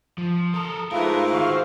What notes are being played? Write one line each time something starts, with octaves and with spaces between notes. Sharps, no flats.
F3
A4 A#4 D#6
G#2 A3 E4 F4 A#4 B4 F5
D#3 F#4 C5 F5 C#6